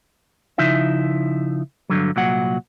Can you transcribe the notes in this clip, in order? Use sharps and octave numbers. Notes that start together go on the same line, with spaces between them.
C#3 F3 D#4 E4 E5
G2 B2 D3 F#3
C2 A#2 F#3 F#5